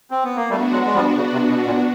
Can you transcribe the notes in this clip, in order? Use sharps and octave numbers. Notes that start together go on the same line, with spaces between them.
C4
B3
A#3
G3 A3 B3 D4 F#4
F#3 G#3
G#3
F3 G3
C#3
C3
B2
A#2